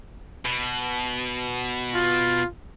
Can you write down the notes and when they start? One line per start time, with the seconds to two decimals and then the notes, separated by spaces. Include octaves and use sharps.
0.45 B2
1.94 F4